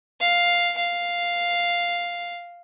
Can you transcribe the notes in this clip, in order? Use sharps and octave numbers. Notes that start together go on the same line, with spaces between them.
F5
F5